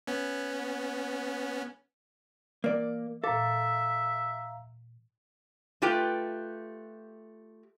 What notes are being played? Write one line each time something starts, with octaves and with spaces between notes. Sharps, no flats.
B3 C#4
E3 A#3 D5
A#2 A4 E5 F5 A#5 D6
A3 F4 G4 B4 G5